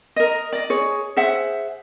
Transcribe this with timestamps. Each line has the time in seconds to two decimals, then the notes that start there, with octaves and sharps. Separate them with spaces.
0.16 A#4 D#5
0.53 D5 D#5
0.70 G#4 C#5
1.17 G#4 C5 E5 F#5